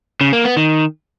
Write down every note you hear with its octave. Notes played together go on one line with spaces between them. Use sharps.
C#3
A#3
B3
D#3